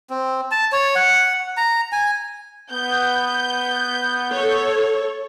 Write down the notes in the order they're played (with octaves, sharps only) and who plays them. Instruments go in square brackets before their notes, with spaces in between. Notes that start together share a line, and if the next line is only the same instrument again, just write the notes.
[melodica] C4
A5
C#5
F#5
A#5
G#5
[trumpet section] B3 [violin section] G6
[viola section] A4 C#5